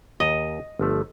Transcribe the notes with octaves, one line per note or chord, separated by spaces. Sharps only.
D#2 D#5 A#5
G1 F3 A3